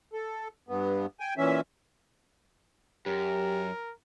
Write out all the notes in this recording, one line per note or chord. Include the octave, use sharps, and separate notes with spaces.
A4
G2 B3
G5 G#5
A#2 E3 C#4 E5
F#2 G4 A#4